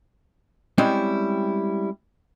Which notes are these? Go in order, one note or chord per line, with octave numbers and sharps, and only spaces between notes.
G3 G#3 C4 C#4 E4